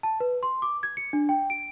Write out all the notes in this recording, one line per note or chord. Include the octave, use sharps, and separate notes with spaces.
A5
B4
C6
D6
G#6
C#7
D4
G5
D7